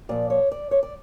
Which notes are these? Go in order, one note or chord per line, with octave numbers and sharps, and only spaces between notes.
A#2 F3 D5
C#5
D5
C#5
D5